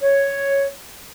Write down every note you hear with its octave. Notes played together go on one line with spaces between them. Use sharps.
C#5